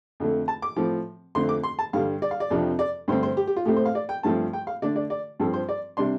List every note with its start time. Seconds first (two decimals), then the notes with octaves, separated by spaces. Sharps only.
0.20 F2 D3 A3
0.48 A5
0.62 D6
0.76 A2 F3 C4
1.35 F2 D3 A3 C4 C6
1.49 D6
1.64 C6
1.79 A5
1.93 G2 D3 G3 F5
2.22 D5
2.31 F5
2.40 D5
2.50 F2 C3 F3 D4
2.79 D5
3.08 G2 D3 A3 C4 C5
3.23 C5
3.37 G4
3.47 G4
3.57 F4
3.66 A2 A3 C4 G4
3.76 C5
3.86 F5
3.95 D5
4.09 G5
4.23 G2 F3 A3 C4 A5
4.53 G5
4.67 F5
4.82 D3 A3 D4 D5
4.96 D5
5.10 D5
5.40 G2 F3 C4 A4
5.53 C5
5.69 D5
5.97 C3 G3 D4 C6